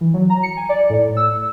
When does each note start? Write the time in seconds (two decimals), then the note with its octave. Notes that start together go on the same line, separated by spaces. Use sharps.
0.01 E3
0.14 F#3
0.30 A#5
0.43 C#7
0.57 G#5
0.69 D5
0.90 A2
1.17 E6